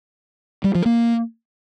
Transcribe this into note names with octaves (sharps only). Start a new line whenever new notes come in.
G3
F3
A#3